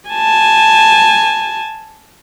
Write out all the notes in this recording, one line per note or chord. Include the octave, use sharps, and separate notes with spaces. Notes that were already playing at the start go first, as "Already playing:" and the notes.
G#5 A5